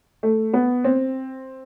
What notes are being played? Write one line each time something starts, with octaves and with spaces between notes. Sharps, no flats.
A3
B3
C4